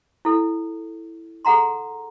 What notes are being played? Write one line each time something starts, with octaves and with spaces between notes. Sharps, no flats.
E4 A4
G#4 A4 F#5 A#5 C6